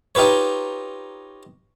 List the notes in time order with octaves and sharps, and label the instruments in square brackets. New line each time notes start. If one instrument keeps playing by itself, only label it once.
[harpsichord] D#4 F4 G4 B4 C#5